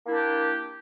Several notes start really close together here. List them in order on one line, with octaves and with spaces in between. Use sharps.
A#3 E4 D4 G4